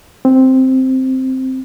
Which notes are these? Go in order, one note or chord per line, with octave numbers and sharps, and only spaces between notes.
C4